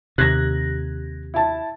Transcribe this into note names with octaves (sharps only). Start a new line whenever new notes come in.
D#2 C3 F#6 G#6 A#6
E4 A5